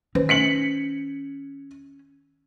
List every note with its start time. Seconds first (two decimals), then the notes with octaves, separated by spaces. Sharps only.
0.15 D#3 C#4 B4 C5
0.29 B6 C#7 F#7